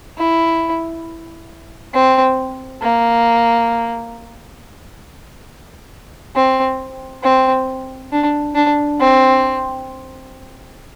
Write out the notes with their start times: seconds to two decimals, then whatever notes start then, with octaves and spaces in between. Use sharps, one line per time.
0.18 E4
1.94 C4
2.82 A#3
6.36 C4
7.23 C4
8.12 D4
8.55 D4
9.00 C4